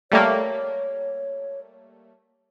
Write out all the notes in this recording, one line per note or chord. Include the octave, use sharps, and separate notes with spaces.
G3 A3 A#3 C#5